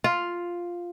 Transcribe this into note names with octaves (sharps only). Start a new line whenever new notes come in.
F4